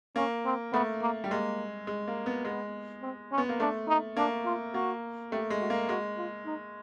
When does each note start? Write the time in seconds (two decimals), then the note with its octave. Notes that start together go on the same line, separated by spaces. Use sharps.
0.16 A#3 C#4
0.45 C4
0.73 A3 B3
1.01 A#3
1.24 G3
1.30 G#3 A#3
1.87 G#3
2.07 A#3
2.26 B3
2.45 G#3 B3
3.02 C4
3.32 C#4
3.38 B3
3.49 A#3
3.60 A3 D4
3.88 D#4
4.17 A#3 D4
4.45 F4
4.74 A#3 F#4
5.32 A3 G4
5.50 G#3
5.61 F#4
5.70 A#3
5.89 G#3 F#4
6.17 F4
6.46 D#4